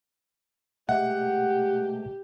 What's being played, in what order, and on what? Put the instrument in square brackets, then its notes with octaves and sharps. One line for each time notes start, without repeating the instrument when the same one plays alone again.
[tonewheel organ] B2 G#3 A3 [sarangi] G4 [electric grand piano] F#5